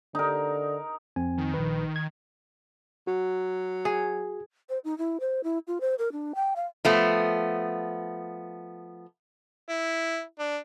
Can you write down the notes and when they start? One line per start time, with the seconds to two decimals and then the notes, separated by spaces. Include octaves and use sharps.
0.15 D3 D#4 A#4
1.16 F2 C4 G#5
1.38 D#3
1.54 A#1 B4
1.96 G#6
3.07 F#3 F#4
3.85 G#4
4.69 C5
4.84 D#4
4.98 E4
5.20 C5
5.44 E4
5.67 F4
5.81 C5
5.99 A#4
6.12 D4
6.35 G5
6.56 F5
6.85 F3 A3 B3
9.69 E4
10.39 D4